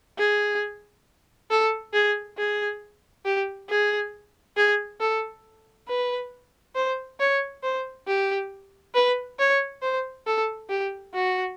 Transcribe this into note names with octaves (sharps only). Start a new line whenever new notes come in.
G#4
A4
G#4
G#4
G4
G#4
G#4
A4
B4
C5
C#5
C5
G4
B4
C#5
C5
A4
G4
F#4